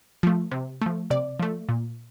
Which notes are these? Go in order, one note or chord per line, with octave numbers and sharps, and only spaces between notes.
F3 A3
C3
F3 A3
C3 D5
F3 A3
A#2